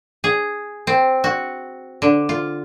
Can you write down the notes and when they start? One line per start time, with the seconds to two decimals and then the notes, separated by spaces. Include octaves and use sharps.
0.24 G#4
0.87 C4
1.24 F#4
2.02 D3
2.29 F4